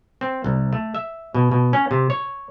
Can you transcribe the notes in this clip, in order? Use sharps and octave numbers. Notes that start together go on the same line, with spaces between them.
C4
C2
A3
E5
B2
B2
C#4
C3
C#5